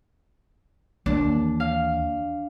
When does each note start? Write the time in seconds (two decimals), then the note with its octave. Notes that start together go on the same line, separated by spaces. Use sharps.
1.06 D#2 E3 D4
1.60 F5